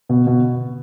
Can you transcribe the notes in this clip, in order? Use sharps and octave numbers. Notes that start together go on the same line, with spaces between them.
B2
B2